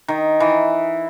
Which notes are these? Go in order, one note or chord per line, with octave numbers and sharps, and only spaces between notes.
D#3
E3